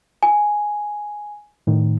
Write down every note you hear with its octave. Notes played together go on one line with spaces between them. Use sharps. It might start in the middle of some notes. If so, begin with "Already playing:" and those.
G#5
A2 D#3